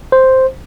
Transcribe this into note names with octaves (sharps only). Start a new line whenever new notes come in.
C5